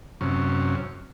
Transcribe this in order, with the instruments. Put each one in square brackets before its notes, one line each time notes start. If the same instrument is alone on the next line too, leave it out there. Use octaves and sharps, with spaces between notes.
[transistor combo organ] F#2 C3 C#4